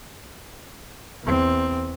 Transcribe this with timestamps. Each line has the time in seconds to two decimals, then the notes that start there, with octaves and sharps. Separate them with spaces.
1.24 E2 C4